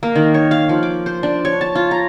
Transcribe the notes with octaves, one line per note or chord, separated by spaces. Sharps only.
A#3
D#3
C#5
F5
F3
D6
C5
D4
C#5
A5
F4
A#5